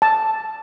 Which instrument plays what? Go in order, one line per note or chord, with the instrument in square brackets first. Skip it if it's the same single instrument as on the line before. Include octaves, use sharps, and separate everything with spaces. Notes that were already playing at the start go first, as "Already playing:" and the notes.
[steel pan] A5